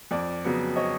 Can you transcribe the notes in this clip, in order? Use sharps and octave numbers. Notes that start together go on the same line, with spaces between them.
F2 D5
C#3 F#3 B3
C#5 D#5